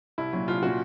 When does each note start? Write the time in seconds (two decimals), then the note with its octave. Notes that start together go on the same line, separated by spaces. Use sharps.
0.18 C2 E4
0.33 A#2 F#3
0.48 C2 F4
0.62 A#2 F#3 F#4